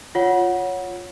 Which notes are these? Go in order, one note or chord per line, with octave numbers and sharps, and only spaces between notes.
F4 C#5 F#5